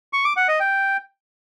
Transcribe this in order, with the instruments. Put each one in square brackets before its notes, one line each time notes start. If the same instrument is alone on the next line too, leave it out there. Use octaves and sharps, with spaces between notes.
[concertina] C#6
D6
F#5
D#5
G5